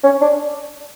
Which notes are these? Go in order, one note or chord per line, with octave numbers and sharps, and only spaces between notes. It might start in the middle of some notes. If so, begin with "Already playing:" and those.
C#4
D4